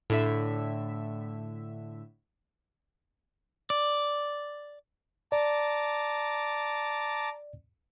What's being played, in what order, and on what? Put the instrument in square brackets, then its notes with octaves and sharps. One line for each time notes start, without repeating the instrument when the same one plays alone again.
[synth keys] A2 D3 E5
[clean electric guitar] D5
[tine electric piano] D5 [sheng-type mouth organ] A5 A#5 D6